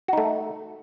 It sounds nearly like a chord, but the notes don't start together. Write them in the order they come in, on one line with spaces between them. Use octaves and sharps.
F#4 D#4 A3